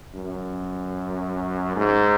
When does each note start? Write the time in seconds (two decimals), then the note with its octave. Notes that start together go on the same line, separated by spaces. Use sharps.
0.15 F#2
1.76 G#2